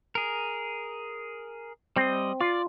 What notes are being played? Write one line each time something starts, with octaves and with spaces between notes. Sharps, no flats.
G#4 A#4
G3 C4 D#5
F4 D5